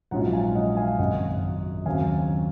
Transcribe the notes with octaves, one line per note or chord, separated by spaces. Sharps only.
A#1 G#2 F#3 C#4 F4 F#5 A#5
F5 G#5
D#5 F#5
F5 G#5
G#1 F#2 C#3 D#5 F#5
D#2 C#3 F#3 C4 F5 G#5